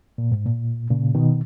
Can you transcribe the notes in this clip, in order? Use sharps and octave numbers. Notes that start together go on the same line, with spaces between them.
A#2
G#2
A#2
A#2 C#3
B2 D#3